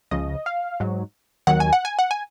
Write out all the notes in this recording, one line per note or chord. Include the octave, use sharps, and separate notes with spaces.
C#2 C#3 F3 D#5
F5
G#2 F#3
D#2 D#3 F#3 F#5
G#5
F#5
G#5
F#5
G#5